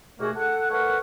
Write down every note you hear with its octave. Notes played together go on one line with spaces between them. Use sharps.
D#2 B2 A3 A#3 F#4 G#4
A4 F#5
A3 A#4 B4 C#5 F#5